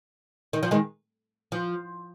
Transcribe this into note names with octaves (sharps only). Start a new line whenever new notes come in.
D#3
F3
D#3 G#3
F3